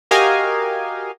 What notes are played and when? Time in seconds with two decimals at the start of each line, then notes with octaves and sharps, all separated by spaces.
0.11 F#4 G4 A#4 D#5 F5 G#5